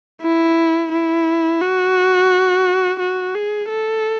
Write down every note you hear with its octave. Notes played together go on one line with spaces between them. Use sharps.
E4
E4
F#4
F#4
G#4
A4